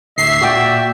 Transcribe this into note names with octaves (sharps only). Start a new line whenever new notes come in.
D2 A2 E5 C7
A#2 F#4 D5 G5